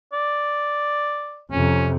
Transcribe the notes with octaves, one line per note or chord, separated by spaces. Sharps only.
D5
F2 C3 C#4